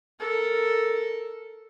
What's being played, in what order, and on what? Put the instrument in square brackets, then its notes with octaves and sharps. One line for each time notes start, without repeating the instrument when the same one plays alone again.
[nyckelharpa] A4 A#4